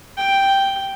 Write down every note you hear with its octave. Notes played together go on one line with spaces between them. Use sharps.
G5